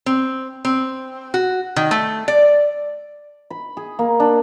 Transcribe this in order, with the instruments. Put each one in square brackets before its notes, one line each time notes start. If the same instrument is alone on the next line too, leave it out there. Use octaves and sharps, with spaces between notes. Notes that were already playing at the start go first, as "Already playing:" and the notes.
[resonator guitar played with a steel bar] C4
C4
F#4
D#3
A3
D5
[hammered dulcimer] B5
G#4
A#3
D4